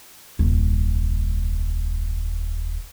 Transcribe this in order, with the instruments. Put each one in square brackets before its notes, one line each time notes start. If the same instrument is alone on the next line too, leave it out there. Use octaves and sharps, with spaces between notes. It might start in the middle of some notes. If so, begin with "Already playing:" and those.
[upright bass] D#1 C2